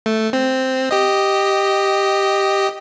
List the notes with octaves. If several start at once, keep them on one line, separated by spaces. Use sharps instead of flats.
A3
C4
G4 D#5